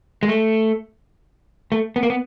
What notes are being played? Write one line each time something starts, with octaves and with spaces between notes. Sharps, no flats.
G#3
A3
A3
B3
A#3
B3